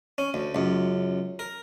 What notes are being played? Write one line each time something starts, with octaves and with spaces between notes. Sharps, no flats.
C#4
D2
C#2 F#2
A#4